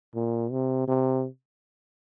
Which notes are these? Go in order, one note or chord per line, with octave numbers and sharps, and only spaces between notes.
A#2
C3
C3